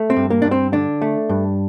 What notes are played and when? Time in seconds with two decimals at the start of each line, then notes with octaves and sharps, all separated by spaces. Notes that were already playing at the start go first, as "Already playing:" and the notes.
Already playing: A3
0.10 C4
0.16 G2
0.30 A#3
0.42 G2 D4
0.51 C4
0.73 D3 D4
1.02 A3
1.29 G2